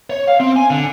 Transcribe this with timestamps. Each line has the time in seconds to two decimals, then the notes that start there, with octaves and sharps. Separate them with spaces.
0.10 C#5
0.28 F5
0.40 C4
0.56 G#5
0.70 D3